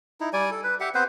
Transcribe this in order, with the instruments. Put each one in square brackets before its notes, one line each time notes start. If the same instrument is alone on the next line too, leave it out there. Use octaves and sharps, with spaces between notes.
[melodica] D#4 E4
G3 D5 G#5
A4
B4
G4 E5 F#5
B3 C4 B4 C5